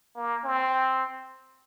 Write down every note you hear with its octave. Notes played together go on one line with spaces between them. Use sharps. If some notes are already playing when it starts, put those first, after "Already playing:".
A#3
C4